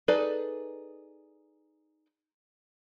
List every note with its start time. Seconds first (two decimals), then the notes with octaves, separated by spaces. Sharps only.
0.08 D#4 G#4 A4 B4 D5